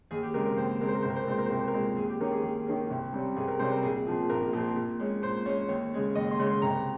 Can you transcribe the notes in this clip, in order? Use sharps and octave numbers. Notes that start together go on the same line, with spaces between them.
D#2 G#4
G4
C#3 G#3 C4 A#4
A#4
D#2 C5
C#3 G#3 C4 A#4
C5
A#4
C2 C5
A#4
C5
A#4
A#2 G#3 C4 C5
A#4
C5
C2 A#4
C5
A#4
A#2 G#3 C4
D#2 G#4
G4
D#3 A#3 C#4 A#4
G#4
D#2 G#4
D#3 A#3 C#4
C2
C3 G3 C#4
C2 G#4
A#4
C3 G3 C#4 C5
A#4
A#1 G#4
A#2 F3 C4
A#1 A#4
A#2 F3 C4
A#2
G#3 C#4
A#2 C5
G#3 C#4 C#5
D#2 C#5
C#3 G#3 C#4
D#2 D#5
C6
C#3 G#3 C#4
C6
C2 A#5